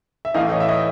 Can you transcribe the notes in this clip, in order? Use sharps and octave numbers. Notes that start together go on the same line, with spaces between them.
E5
A2 E3 A3 D#5 F5
C#5 D#5
E5
C#5 D#5